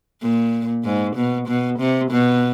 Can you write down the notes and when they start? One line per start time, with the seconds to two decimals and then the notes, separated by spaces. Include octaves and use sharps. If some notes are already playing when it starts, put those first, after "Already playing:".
0.22 A#2
0.85 G#2
1.16 B2
1.48 B2
1.79 C3
2.11 B2